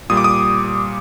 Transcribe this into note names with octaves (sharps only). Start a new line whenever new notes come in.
A#2 G3 D#6
D6
D#6